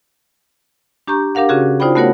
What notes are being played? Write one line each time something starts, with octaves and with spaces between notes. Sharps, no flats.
D4 G4 A#5 C#6 G6
D4 G4 A#4 F5 F#5
C#3 C#4 F#4 G#4
D#4 F4 C5 D5 G5 B5
A3 B3 F#4 A#4 C#5 F#5